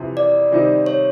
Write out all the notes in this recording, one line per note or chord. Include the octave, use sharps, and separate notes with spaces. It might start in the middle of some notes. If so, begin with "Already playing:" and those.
Already playing: F2 C3 E3
D5
C3 D#3 G3 C4 D#4
C#5